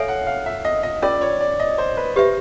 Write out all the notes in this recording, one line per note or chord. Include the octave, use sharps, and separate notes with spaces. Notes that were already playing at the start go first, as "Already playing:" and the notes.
Already playing: A4 C#5 E5 F5 G#5
F#5
F5
E5
D#5
D#5
C#4 F4 A#4 D5
C#5
D5
D#5
C5
B4
G4 B4 C5 E5